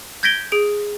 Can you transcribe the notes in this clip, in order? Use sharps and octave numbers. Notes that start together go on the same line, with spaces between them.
G6 G#6 A#6 B6 D7 G7
G#4 D7